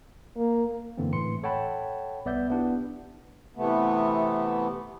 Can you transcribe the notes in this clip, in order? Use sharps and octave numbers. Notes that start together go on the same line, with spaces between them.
A#3
F#2 D3 E3 A#3 C4
A2 E3 C6 C#7
A4 C#5 F#5 G5 A5 B5
C2 B3 D5 E5 G6
B3 D4 E4 G4
C3 E3 A3 B3